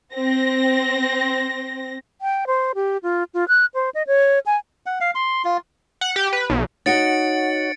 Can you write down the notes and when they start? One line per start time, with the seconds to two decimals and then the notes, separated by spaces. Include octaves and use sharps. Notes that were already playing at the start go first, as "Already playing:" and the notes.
0.15 C4 A#6
2.22 G5
2.47 C5
2.75 G4
3.03 F4
3.34 F4
3.48 F#6
3.74 C5
3.95 D#5
4.07 C#5
4.46 G#5
4.86 F#5
5.01 F5
5.15 C6
5.45 F4
6.01 F#5
6.16 G4
6.33 B4
6.50 B1
6.86 D#4 F#4 C#5 D#5 F#5 A6 C#7 D7